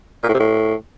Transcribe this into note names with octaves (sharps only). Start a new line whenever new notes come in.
A#2
A2
C3
A2